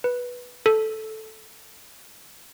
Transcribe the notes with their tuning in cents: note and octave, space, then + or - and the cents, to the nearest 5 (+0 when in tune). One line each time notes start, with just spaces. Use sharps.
B4 -10
A4 -5